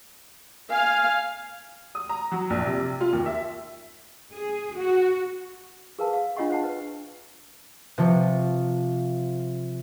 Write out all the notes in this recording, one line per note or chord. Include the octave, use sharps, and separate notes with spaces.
F5 G#5
D#6
A#5
F#3
A#1
C3
F4
D#2
E5
G#4
F#4
G#4 A#4 B4 F5 A5
F5
D4 F4 C#5 D#5 F#5 C#6
C5 F#5 A5
B4
C3 F3 F4 C#6